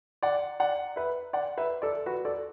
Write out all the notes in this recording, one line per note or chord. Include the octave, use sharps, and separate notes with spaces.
D5 F#5
D5 F#5
B4 E5
D5 F#5
B4 E5
A4 D5
F#4 B4
A4 D5